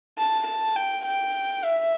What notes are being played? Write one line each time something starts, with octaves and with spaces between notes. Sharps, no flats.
A5
A5
G5
G5
E5